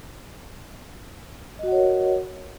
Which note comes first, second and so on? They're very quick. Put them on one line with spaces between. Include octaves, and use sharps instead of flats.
D#5 F#4 F#5 C#5 A#4